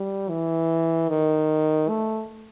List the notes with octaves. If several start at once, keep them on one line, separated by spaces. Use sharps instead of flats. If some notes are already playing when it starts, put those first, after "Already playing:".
Already playing: G3
E3
D#3
A3